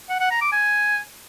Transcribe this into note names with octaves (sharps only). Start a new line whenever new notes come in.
F#5
F#5
A#5
D6
G#5